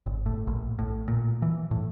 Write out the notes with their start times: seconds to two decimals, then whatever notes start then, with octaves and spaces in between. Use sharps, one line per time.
0.06 G1
0.26 A2
0.47 A#1
0.79 A2
1.08 A#2
1.42 E3
1.71 A2